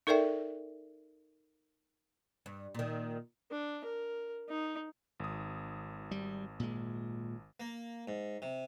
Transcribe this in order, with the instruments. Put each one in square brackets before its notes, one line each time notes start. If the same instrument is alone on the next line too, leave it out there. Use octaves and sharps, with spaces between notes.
[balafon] D#4 A4 A#4 D5 E5 G5
[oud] G2
A#2 D#3
[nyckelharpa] D4
A#4
D#4
[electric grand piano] G#1 D#6
[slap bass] G3
A#2 G#3
[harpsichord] A#3
G#2
C3